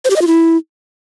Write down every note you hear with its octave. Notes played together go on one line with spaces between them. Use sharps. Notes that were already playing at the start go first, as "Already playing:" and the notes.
C5
G4
D#5
F4
E4